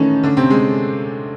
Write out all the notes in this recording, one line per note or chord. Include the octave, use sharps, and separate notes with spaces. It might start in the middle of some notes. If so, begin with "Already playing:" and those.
Already playing: D#3 E3 A3 C#4 D#4
D3 D4
C3 C4
G#3